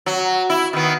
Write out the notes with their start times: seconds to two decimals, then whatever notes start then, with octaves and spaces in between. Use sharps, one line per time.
0.06 F#3
0.50 E4
0.73 D#3 B3